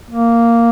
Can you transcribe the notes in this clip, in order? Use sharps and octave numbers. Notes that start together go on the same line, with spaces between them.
A#3